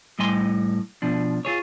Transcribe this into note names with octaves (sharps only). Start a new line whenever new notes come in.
A2 G3 D#5 G#5 C6
B2 F3 D4
F4 G#4 C#5